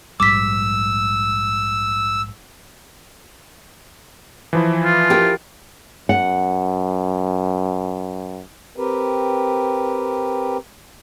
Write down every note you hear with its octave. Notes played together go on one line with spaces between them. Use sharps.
A#1 G#2 G3 D6 E6 B6
E3 F3 E4
F4
G4 A#4 G5
F#2 F#5
C4 G4 A#4 B4